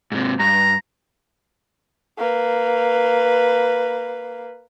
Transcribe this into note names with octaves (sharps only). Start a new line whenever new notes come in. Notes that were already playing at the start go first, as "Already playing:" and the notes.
G#2 C3
G2 A#5
A#3 B4